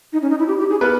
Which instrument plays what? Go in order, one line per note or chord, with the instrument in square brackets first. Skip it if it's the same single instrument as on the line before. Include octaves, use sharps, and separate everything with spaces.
[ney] D#4
C#4
D#4
E4
G4
G4
G#4
[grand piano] B3 B4 [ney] A#4